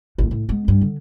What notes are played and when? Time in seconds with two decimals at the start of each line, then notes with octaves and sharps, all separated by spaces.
0.18 A1 D#2
0.31 A2
0.49 G#3 B3
0.68 G2
0.81 D3